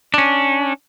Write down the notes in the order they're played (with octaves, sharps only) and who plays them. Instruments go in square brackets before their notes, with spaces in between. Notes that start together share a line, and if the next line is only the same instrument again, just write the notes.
[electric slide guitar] C#4 D4